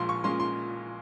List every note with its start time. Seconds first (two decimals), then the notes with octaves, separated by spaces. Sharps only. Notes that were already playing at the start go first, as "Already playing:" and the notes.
Already playing: A#1 A#2 G#3 F4 C6
0.09 C#6
0.24 A#2 G#3 C#4 F4 C6
0.40 C6